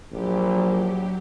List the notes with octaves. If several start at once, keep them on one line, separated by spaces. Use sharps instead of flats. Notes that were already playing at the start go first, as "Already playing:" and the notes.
A#1 F#3 G4